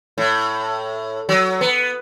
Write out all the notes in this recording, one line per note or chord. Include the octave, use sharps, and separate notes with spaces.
A2
F#3
B3